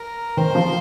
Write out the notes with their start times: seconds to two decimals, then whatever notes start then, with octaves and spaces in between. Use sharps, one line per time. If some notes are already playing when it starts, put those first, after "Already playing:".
Already playing: A#4
0.37 D#3 C5
0.55 F3